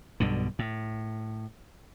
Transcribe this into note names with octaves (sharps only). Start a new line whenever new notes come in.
B1 G2 B2 D3
A2